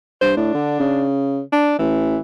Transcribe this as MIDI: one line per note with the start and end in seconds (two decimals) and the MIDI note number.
0.21 0.35 43
0.21 0.34 72
0.37 0.51 45
0.37 1.07 62
0.54 0.75 50
0.80 1.41 49
1.52 1.78 62
1.79 2.18 33
1.79 2.21 52